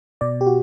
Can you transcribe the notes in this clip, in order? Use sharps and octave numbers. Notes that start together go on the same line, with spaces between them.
B2 D5
G4
F#4